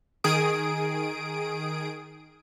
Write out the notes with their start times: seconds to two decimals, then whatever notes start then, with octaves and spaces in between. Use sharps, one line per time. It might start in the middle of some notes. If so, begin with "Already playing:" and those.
0.24 D#3 G#4 D#6 D7